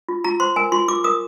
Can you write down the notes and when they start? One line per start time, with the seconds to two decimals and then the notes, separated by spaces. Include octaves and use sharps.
0.08 F4
0.24 F4 A#5
0.40 C5 C6
0.56 A#4 G#5
0.72 F4 C6
0.88 F4 D6
1.04 A#4 D#6